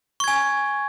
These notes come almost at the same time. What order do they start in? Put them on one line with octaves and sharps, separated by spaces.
C#6 G#6 G#5